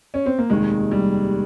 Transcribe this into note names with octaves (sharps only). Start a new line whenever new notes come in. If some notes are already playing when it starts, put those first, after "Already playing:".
C#4
C4
A#3
F1 D#2 D#3 G#3
G3